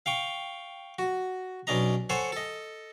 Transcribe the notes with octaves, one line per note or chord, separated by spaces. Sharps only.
F5 G5 C#6
F#4
B1 C#4 D4 D#5 A#5
A4 C5 C#5 F#5 G#5
A4 D#5